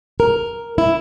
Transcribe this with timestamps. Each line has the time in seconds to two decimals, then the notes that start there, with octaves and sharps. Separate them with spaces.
0.20 A#4
0.78 E4